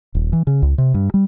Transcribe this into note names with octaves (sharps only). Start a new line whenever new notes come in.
D#1
E3
C#3
C#2
C3
G2
G3